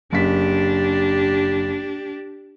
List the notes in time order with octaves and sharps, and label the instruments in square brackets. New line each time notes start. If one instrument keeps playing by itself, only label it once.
[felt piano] F#1 B6 [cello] D4 G4